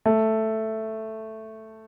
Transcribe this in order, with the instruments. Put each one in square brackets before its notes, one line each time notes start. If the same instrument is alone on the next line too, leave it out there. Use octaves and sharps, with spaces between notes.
[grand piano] A3